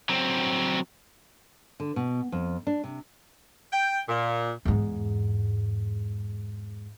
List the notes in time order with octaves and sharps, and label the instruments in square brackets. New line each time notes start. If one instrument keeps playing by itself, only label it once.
[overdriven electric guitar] F#3 C4
[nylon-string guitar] D3
B2
F2
D4
C3
[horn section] G5
A#2
[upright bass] E2 G#2